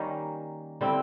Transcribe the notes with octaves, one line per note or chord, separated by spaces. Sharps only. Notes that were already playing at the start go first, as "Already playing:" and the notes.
Already playing: D#3 G3 A#3 C#4
D3 G3 C4 E4